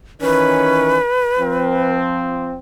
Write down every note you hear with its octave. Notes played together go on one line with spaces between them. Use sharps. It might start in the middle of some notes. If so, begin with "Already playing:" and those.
D#3 E3 C#4 B4
F3 C4